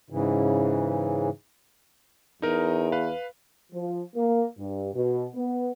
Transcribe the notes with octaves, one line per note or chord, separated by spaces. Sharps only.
G#2 C#3 E3
E2 D#4 A#4 D#5
B4 F5
F3
A#3
G2
B2
B3